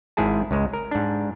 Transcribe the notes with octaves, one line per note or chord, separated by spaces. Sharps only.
G#1 G#2 E4 G#4 A5
C#2 G#3
A#4
G#2 D4